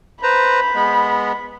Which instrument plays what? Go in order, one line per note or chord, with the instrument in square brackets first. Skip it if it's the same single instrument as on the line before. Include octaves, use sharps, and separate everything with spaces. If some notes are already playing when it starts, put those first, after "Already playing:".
[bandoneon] B4 C5 A#5 [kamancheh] B5
[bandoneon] G#3 B3